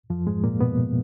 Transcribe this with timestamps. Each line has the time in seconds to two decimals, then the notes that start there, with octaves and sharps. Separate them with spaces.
0.10 F2 F3
0.27 G#2 G#3
0.44 A#2 A#3
0.60 B2 B3